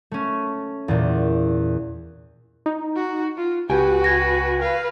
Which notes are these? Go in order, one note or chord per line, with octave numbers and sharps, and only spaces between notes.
A3 C#4
E2 A#2
D#4
F#4
F4
C#2 F#4 G4 B4 G5 G#5
G#6 A#6
B4 F5